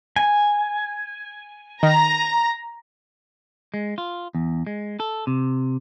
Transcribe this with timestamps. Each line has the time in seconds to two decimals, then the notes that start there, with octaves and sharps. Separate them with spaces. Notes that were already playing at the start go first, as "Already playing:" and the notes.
0.16 G#5
1.83 D#3 A#5
3.74 G#3
3.98 F4
4.35 E2
4.67 G#3
5.00 A4
5.27 C3